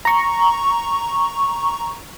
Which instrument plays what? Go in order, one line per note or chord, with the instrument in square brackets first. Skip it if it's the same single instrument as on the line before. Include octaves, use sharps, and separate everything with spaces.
[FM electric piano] A#5 C#6